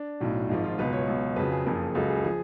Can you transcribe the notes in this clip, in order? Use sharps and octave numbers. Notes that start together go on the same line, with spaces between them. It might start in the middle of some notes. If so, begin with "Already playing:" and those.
Already playing: D4
B1 A2 F#3
G#1 G#2 F3
F4
C#2 B2 F#3 B4
C#5
C#2 B2 F#3
F2 C#3 F#3 B4
G#4
F#1 F2 C#3 F3
C#2 C#3 F#3 A4
G#4
F3 G#4